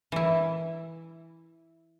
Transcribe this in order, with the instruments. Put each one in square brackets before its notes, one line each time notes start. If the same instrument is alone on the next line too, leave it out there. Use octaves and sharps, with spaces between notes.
[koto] E3 E4